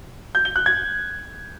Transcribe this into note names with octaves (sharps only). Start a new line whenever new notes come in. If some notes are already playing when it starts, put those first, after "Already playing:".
G6
G7
F#6
G#6